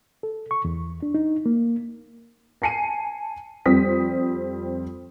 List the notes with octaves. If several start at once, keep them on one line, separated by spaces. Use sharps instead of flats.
A4
C#6
E2
D4
D#4
A#3
G#5 A5 C7 C#7 D#7
F2 G3 C4 D#6 B6